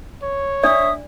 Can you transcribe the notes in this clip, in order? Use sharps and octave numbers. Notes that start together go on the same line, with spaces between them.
C#5
D4 D5 E5 D#6